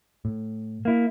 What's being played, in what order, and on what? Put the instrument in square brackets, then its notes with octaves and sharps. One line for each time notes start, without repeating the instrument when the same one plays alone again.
[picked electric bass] A2
[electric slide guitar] A#3 E4